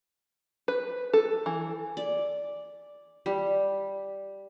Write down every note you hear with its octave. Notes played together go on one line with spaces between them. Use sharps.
B4
A4
E3
D5
G3